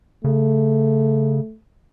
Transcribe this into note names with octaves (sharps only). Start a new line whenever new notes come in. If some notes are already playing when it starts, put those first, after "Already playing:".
C#3 A3